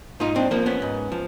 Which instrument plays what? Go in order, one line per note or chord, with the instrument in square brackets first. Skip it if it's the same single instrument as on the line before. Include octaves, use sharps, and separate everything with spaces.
[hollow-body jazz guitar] G#2 D#4 F4
C4 D4
F3 A#3 C4
B3 C#4
G#2
F3